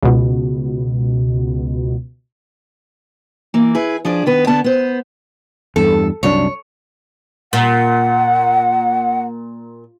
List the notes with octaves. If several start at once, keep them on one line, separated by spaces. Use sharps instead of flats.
C#2 B2
E3 A#3
E4 G#4 B4
F3 D4 G#4 D5
D#3 B3 B4
D3 B3 A5
B3 C5
E2 G2 A4
C2 F#2 D4 C#5
A#2 F#5